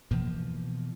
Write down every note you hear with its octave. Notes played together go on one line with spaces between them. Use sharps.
B2 E3 F3 A#3